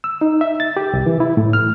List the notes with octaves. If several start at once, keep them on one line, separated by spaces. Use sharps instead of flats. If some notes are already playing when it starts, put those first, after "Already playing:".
E6
D#4
E5
A6
G4
C2
E3
E4
A2
F6